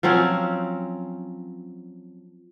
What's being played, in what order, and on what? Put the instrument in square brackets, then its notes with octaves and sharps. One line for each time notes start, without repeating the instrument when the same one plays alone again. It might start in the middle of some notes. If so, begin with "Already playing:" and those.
[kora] F3 F#3 C4 C#4